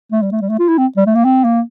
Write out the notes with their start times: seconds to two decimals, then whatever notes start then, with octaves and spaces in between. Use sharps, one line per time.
0.12 A3
0.22 G3
0.32 A3
0.41 G3
0.50 A3
0.59 F4
0.69 E4
0.78 C4
0.97 G3
1.07 A3
1.15 A#3
1.25 C4
1.44 A#3